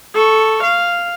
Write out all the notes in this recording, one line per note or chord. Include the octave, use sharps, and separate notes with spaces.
A4 C#6
F5